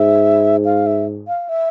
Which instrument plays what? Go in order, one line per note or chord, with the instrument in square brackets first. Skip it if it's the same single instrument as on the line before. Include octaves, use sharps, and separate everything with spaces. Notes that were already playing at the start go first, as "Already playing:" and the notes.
Already playing: [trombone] G#2 [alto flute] E5
[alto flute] F5
E5
F5
E5